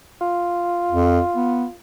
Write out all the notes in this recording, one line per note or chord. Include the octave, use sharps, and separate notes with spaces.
F4
F2
B3